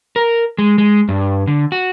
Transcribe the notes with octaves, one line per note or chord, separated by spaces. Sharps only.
A#4
G#3
G#3
G2
D3
F#4